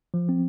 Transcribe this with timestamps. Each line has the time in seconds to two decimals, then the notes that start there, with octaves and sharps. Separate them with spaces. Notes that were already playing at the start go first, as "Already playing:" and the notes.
0.14 F3
0.29 C4